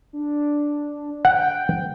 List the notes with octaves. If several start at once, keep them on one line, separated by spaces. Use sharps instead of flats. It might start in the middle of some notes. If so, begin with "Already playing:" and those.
D4
F#5 G5